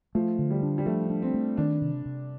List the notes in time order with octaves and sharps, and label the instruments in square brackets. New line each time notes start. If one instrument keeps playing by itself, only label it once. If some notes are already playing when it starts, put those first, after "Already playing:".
[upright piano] F3 [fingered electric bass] A3
[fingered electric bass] D3
[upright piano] G3
[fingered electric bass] D4
[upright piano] G3
[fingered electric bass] F3 [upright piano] A3
[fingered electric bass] D4
[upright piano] C4
[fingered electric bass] A3
[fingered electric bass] D#3 [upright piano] D4
[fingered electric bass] C3
C3